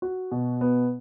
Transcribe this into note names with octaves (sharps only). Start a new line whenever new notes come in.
F#4
B2
B3